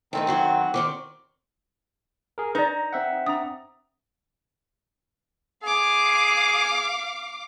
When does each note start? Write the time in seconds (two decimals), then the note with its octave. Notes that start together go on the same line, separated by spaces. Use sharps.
0.13 D#3 A3 C4 C#4 D#4
0.27 F#2 F#3 F#4
0.74 D#3 C4 D5 C#6 D6
2.38 G#4 A#4
2.55 D#4 B4 D5 A#5
2.93 C4 E5 F#5
3.26 D4 A#5 D#6
5.64 G#4 F5 D6